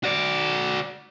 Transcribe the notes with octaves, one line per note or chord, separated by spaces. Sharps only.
F#4 D5